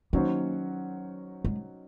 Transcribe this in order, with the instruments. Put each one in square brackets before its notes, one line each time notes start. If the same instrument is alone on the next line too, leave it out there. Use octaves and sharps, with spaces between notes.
[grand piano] D#3 F#3 C#4 F#4 C5 [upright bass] A#3
[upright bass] G#3